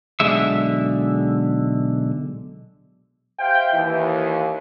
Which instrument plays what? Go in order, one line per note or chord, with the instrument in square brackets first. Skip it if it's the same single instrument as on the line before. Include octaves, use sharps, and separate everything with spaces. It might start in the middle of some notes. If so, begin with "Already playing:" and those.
[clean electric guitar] B1 D3 G#3 E5
[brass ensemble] G4 C5 E5 F5 G5
D#2 E3